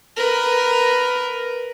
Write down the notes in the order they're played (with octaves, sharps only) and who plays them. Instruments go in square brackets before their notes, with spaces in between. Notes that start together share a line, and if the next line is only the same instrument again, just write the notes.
[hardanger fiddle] A#4 B4